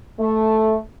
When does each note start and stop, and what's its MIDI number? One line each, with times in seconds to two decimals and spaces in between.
0.18 0.76 57